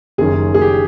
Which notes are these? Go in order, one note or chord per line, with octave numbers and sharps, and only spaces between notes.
F#1 F#2 D#3 G#4
G#4
G4